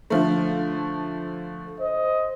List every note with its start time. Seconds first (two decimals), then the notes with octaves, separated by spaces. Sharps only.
0.10 D3 F3 A3
1.80 C5 D#5